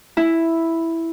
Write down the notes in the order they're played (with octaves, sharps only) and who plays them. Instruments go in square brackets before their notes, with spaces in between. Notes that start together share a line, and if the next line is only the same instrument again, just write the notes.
[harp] E4